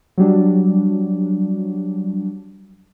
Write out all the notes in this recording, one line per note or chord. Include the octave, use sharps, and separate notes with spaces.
F#3 G3 D4